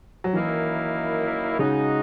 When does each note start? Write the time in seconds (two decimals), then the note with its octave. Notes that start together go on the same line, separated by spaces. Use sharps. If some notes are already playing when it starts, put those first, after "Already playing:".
0.24 F#3
0.33 F#2 D#3 E3 A#3 E4
1.59 C#3 G#3 D#4 F#4